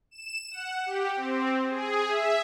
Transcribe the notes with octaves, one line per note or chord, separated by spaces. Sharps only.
E7
F#5
G4
C4
G#4
E5